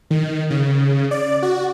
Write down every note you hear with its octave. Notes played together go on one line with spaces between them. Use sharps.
D#3
C#3
D5
F#4